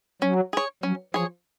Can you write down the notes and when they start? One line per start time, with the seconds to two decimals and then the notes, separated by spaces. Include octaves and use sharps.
0.22 F#3 C#4
0.53 G#4 C#5
0.83 F#3 C#4
1.14 F3 G#4 C#5